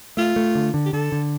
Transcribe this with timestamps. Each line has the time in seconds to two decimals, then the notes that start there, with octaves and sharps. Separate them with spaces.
0.17 A3 F4
0.36 A3
0.55 D3
0.74 D3
0.85 G4
0.93 D3 A4
1.12 D3